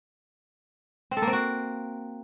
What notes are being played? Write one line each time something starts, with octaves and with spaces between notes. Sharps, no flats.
C4
A4
A#3
C4
F#4